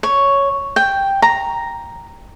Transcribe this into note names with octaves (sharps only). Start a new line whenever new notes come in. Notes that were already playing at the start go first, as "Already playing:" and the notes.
C#5
G5
A#5